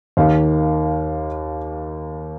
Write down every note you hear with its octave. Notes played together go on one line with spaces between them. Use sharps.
D#2 D#3 A#3 F5